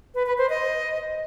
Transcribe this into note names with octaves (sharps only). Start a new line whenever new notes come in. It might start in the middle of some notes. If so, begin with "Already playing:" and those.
B4
B4
C5
D#5